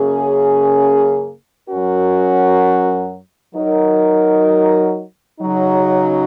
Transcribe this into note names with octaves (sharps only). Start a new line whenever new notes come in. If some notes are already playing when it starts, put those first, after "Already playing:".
Already playing: F#2 C#3 A#3 C#4 G#4
F#2 F#3 C#4 F#4 A#4
F#3 D#4 A#4
C#3 F#3 D#4